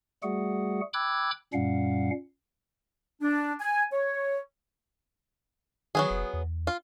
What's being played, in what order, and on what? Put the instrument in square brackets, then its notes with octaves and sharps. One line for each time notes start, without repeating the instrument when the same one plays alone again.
[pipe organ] G3 A3 F#4 G#4 F#5
G5 B5 D6 E6 F#6 G#6
F#2 A#2 G3 C#4 F5 F#5
[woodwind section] D4
G#5
C#5
[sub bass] D#3 [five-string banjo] F#3 B3 G#4
[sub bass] F1
E2
[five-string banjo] F4